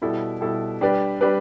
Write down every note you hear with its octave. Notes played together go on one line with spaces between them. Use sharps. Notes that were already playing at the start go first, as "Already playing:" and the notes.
B2 G3 E4 A4
B2 G3 E4 A4
G3 D4 G4 B4 D5
G3 D4 G4 B4 D5